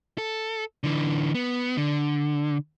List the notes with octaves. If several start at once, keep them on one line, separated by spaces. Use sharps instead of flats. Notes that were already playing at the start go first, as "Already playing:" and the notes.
A4
D3 E3
B3
D3